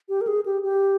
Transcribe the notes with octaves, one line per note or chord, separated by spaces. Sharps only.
G4
A#4
G#4
G4
G4